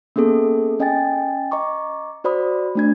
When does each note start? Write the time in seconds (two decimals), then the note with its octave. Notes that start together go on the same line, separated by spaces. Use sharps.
0.16 A#3 B3 C#4 G#4 A4
0.80 C#4 D#5 G5 G#5 A6
1.51 D#5 A#5 C#6 D6
2.24 F#4 C5 D5 B5 D#6
2.75 A3 D4 G#6